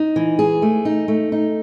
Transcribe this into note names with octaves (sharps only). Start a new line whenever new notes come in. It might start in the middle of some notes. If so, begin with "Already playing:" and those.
Already playing: D#4
E3
G#4
A3
D#4
A3
D#4